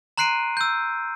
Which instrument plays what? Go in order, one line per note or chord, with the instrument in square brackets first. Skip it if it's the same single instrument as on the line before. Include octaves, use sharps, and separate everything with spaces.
[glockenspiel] A#5 C6 F#6 C7 D7 D#7
E6 G6